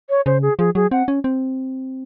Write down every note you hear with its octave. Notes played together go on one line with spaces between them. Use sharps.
C#5
C#3 C5
G#4
F3 G#4
F#3 G#4
C4 F#5
C#4
C4